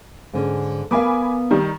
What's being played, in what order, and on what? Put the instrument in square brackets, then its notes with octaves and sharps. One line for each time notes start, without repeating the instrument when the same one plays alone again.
[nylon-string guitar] G#2 D3 C#4
[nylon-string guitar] B3 A#4 F5 [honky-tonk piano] G#5 B5 D6
[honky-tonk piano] D#3 G3